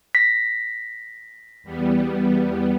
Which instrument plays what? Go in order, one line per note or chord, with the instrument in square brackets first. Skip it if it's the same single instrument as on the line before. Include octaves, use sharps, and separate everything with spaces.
[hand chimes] A#6 B6
[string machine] E2 G3 B3